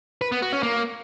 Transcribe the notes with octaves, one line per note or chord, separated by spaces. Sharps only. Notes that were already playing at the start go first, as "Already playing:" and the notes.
B4
B3
F#4
C#4
A#3